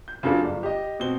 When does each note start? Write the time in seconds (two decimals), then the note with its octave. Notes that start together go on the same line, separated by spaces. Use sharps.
0.08 G6
0.23 C#3 F#3 D4 F4 A4
0.44 G1
0.63 G4 D#5
1.00 B2 C4 G7